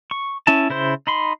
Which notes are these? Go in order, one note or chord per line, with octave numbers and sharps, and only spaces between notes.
C#6
C#4 E4 A5
C#3 E4 C5 C6
D#4 B5 C6